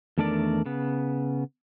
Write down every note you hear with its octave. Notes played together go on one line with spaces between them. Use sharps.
E2 D#3 A3 D4 A#4 D5
C#3 B3